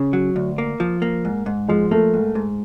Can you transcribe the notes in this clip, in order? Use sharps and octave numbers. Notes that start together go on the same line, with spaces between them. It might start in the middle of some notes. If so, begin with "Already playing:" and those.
Already playing: C#3
F#3
D2
A#3
F3
A#3
G#2
G#2
F3 G#3
A3 A#3
G#2
G#2